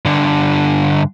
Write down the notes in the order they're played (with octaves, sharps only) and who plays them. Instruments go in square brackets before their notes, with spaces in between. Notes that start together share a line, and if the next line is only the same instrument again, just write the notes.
[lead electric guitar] G2 D3